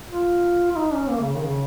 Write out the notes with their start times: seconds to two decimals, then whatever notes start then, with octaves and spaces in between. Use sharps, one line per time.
0.08 F4
0.72 F4
0.76 D#4
0.93 C#4
1.10 A#3
1.21 C#3
1.35 D#3
1.43 C#3